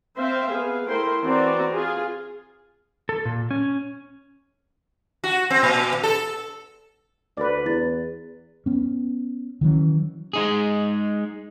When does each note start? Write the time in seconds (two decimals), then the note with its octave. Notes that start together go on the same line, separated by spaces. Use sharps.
0.16 C4 C5 E5 F5
0.48 B3 G#4 F5
0.87 A3 E4 A#4 C5 G5 C6
1.22 E3 C4 F#4 D5 A#5
1.73 F4 G#4
3.09 A4
3.25 A#2
3.51 C#4
5.24 F#4
5.50 C4
5.63 A#2
6.03 A4
7.37 D2 B4 D5
7.66 E2 E4 A6
8.66 B3 C#4
9.61 D#3 E3 F#3 C#4
10.33 G#3 D#4 G#4